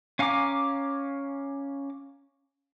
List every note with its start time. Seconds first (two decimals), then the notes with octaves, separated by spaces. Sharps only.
0.19 C#4 F5 G#5 A#5 D6